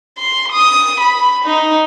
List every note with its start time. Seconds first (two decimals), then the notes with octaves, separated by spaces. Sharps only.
0.18 C6
0.52 D#6
1.00 B5
1.45 D#4